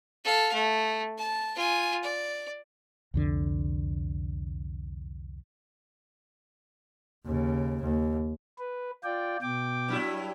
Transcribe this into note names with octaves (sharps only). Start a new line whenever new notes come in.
A4 F5
A3
A5
F4 G#5
D5
C2 F2 D3
D#2 C#3
D#2
B4
F4 D5 G5
B2 G5 D6
G2 F#3 E4